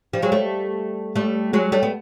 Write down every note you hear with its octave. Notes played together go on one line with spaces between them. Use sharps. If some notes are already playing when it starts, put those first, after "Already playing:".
F3 G3
F#3 G#3
G3 A3
G3 A3
F#3 G#3
G3 A3
B3